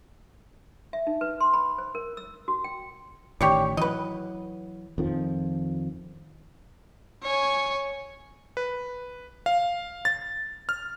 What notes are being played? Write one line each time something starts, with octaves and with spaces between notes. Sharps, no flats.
E5
D#4
B4
C6
B5
C5
A#4
E6
F#4
G5
A1 D#3 G4 C#5 D5
E3 F#3 B4 D#5
F2 D#3 F3
C#5 G#5
B4
F5
A6
F6